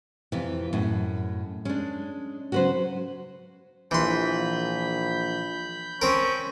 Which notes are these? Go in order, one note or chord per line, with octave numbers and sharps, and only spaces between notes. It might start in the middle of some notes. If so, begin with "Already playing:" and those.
F2 C3 E3
F#2 A2
G#3 C#4 D4
C#3 F#3 F#4 B4 C5
A#1 E3 B5 C6 G6
C4 C#4 A#4